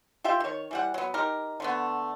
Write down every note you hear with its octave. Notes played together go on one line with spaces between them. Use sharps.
F4 G4 E5 G5
D#3 C#5
E3 G3 F#5
F#3 B3
D#4 G4 A#4
D3 A3 B3